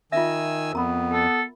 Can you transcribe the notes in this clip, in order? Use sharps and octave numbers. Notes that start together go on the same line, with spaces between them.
D#3 F4 E5 G#5 E6
F2 B3 A#4 A#5 B5
A4